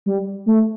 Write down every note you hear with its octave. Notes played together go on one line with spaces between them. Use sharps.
G3
A3